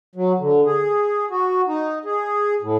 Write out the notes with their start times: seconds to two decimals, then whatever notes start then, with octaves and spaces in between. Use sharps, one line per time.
0.15 F#3
0.40 D3
0.66 G#4
1.30 F#4
1.68 D#4
2.05 G#4
2.62 A2